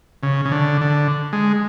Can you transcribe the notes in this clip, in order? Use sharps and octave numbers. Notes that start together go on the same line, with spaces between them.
C#3
C#3
D3
D3
G#3